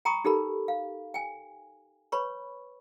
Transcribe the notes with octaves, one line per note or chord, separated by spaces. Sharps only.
G5 A#5 B5 C#6 D#6
D#4 G4 A4 A#4 B5
F5
G5 G#5
B4 C#5 B5 C#6